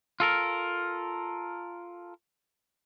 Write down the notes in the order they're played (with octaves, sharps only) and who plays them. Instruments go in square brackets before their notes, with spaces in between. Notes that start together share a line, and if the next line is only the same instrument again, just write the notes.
[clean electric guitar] F4 A4 A#4